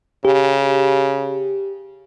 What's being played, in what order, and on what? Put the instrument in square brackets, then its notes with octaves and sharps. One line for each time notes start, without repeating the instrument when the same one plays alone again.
[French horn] C#3 [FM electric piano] G4